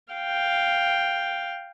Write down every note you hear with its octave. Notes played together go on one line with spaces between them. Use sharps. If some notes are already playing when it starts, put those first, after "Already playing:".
F5 G5